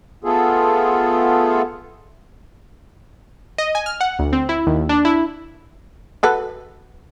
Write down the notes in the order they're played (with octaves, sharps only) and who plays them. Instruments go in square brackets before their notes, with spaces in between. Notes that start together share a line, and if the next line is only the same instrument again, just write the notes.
[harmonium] A3 B3 F4 G#4 A4
[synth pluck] D#5
G#5
F6
F#5
D2
C4
E4
D#2
D4
E4
[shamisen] F#4 A4 B4